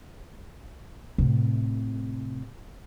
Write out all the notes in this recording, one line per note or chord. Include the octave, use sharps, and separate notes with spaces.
A2 C3